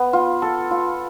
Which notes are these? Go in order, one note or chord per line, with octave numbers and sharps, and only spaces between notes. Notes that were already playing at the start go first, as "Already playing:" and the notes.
Already playing: B3
F4
A4
F4